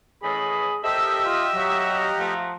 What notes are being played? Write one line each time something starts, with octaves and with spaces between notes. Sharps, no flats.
A2 E3 C#4 G#4 D#5 B5
G4 A4 A#4 C5 D#5 E5
F4
F#3 F5 F#5 A#5
F3 A3